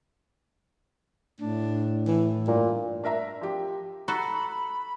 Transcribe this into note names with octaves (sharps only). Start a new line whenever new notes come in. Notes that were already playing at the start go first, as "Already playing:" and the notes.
A2 D4
E3
G2 A#2
D4 A#4 E5 A#5
F3 G4
F#4 A4 A#5 B5